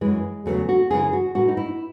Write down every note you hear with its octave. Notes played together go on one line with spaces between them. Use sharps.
F#2 E3 G#3
E2 C#3 F#3 A3
F#4
F#2 C#3 E3 G#4
F#4
A2 E3 F#4
D#4
E4